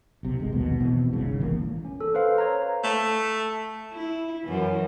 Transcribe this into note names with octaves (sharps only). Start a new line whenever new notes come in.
B1 C3
G1 G#3
A#1 D#2 B2
E1 B2 E3 C4
G1 C2 G#2 C#3
E1 A1 E3 A#3
C#4
A4
B4 C5 F5
C#5 A#5
A3
E4
F#2 E3